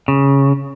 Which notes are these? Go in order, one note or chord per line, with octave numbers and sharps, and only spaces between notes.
C#3